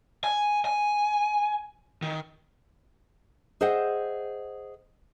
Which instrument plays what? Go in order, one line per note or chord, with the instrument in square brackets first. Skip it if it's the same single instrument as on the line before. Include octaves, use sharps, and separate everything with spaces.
[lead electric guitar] G#5
G#5
D#3
[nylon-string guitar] G#4 C5 D#5 E5 F#5 G5